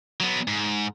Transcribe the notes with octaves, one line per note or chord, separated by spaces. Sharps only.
F#3 B3
G#2